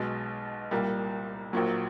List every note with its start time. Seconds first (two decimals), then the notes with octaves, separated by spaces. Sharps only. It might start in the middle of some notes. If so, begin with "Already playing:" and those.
Already playing: B1 B2 G#3
0.71 C2 A#2 G3 A#3
1.53 A#1 A#2 F#3